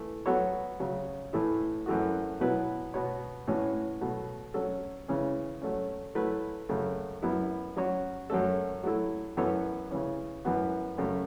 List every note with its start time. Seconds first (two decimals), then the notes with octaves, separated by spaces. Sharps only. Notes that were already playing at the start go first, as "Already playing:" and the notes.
Already playing: E3 A3
0.26 F#3 B3 F#4 A4 C#5
0.79 C#3 F#3 C#4
1.33 A2 E3 A3 E4
1.86 F#2 E3 A3 F#4
2.40 B2 F#3 B3 E4 B4
2.94 B2 B3 F#4 C#5
3.47 A2 E3 C#4 F#4
4.01 B2 F#3 A3
4.54 F#3 C#4 A4
5.08 C#3 E3 C#4
5.62 F#3 A3 C#4
6.15 F#3 A3 E4 B4
6.69 F#2 C#3 A3
7.22 F#2 F#3 B3 E4
7.76 F#3 C#4 F#4 C#5
8.30 F#2 F#3 A3 C#4 A4
8.83 F#3 A3 E4 A4
9.37 F#2 E3 B3 A4 C#5
9.91 C#3 E3 C#4
10.45 F#2 E3 B3 F#4
10.97 F#2 C#3 A3 C#4